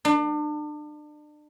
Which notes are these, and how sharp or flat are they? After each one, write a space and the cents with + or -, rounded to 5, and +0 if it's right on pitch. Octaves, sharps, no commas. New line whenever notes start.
D4 +35